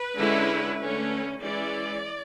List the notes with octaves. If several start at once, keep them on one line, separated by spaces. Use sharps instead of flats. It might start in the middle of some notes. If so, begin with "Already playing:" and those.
Already playing: B4
D3 G#3 C#4 E4
D3 A3 C#4
E3 G#3 C#4 E4 D5